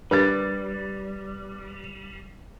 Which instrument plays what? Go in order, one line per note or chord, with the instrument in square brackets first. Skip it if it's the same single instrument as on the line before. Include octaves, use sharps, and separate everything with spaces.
[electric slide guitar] G3 [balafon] D4 G4 A#4 [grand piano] B4 A6